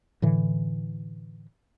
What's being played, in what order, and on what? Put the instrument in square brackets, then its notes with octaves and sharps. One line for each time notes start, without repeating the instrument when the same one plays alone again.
[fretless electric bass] A2 D3 E3